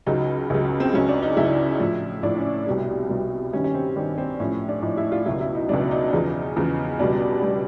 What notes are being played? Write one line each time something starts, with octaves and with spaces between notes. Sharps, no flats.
C#2 C#3 F#3 D#4
C#2 C#3 F#3
C4
C#2 C#3 F#3 C#4
D4
D#4
C#2 C#3 F#3 E4
A2 F3
A2 F3 D4
C#4
C2 B2 G3
C2 B2 G3
G2 D#3 G3 C#4
C#4
C4
G2 D#3 G3 D4
C4
A2 F3 C#4
D4
A2 F3 D#4
E4
F4
C#2 B2 F#3 E4
E4
D#4
C#2 B2 F#3 D4
D#4
E2 C#3 F3
E2 C#3 F3
C#2 B2 G3 D4
B2 G3